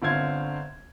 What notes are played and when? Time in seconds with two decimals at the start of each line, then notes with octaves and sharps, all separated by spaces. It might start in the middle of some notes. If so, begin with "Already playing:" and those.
0.02 G1 D3 C4 F5 G#6